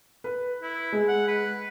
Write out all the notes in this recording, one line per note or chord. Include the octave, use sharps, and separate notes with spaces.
B4
E4
G#3
F#5
B4